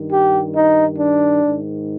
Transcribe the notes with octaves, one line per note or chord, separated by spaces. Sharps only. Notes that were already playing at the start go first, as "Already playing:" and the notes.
Already playing: G2 D#3
G4
D#4
D4
G#2 D#3